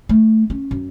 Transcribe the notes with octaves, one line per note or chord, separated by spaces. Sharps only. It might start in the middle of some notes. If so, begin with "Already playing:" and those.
A3
C#4
F#2